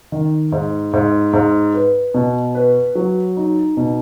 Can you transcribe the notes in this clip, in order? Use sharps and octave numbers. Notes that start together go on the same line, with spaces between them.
D#3
G#2
G#2
G#2
B4
B2
B4
F#3
D#4
B2